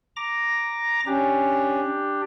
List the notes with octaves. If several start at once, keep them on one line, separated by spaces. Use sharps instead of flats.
A#5 D6 A#6
C#4 D4 G4